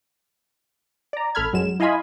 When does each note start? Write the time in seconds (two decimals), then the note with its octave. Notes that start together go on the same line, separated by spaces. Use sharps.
1.13 D5 A#5
1.35 A1 A4 B5 F6 G#6
1.53 F#2 F#3 G#3 E7
1.80 E4 D#5 F5 G#5 B5 C6